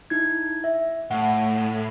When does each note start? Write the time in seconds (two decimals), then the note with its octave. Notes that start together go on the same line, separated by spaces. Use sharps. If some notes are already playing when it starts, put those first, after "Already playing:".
0.10 D#4 E4 G#6
0.64 E5
1.11 A2 F#5